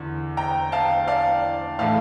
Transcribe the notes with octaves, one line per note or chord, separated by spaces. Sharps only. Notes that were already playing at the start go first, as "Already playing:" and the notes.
Already playing: E2 D3
G5 A#5
F5 A5
D5 F5
A2 E3 A3 F5 A5